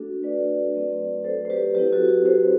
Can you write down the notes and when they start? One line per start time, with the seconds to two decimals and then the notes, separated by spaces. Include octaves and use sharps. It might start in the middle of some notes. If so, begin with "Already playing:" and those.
Already playing: A3 D4 F#4 A4
0.23 B4 D5
0.75 F#3 A3 C4 F#4
1.24 A4 C5
1.45 C5
1.50 G4 B4
1.75 F#3 C4 E4 G4 B4
1.92 F#4 A4
2.09 G4
2.26 A4 C5